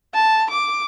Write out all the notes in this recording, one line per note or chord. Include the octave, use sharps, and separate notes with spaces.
A5
D6